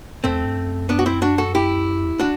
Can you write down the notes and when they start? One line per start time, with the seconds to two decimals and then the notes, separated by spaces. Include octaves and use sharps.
0.24 E2 A3 C4
0.45 G2
0.57 F#2
0.89 B3 D4
0.99 F#4
1.06 C4 E4
1.22 D4 F#4
1.38 F#4 A4
1.55 E4 G4
2.05 E2
2.19 D4 F#4